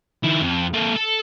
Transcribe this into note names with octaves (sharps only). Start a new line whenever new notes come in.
D#3 E4
F2
A#3 A4
A4